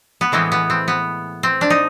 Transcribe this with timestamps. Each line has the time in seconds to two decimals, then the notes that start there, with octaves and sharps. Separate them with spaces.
0.21 B3
0.32 A2 E3 G#3 B3 C4
0.52 B3
0.70 C4
0.88 B3
1.43 C4
1.61 D4
1.70 D#4